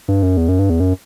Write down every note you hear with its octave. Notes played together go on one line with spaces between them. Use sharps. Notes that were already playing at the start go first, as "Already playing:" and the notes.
G2
F#2
E2
F#2
G2
E2
F#2